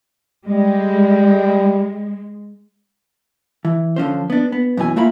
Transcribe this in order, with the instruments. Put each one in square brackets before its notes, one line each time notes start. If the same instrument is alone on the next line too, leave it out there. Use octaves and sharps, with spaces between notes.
[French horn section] G3 [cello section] G#3
[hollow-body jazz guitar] E3
D3 F3 C#4 C5
B3 D4
B3
F#2 B2 E3 G#5
A3 A#3 E4 F4 B5